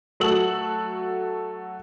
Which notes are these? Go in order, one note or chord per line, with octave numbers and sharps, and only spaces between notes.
F#3 A3 F#4 A4 E6 F#7